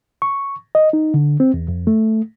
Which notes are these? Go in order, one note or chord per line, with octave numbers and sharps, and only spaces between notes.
C#6
D#5
D#4
D3
C4
E2
F2
A3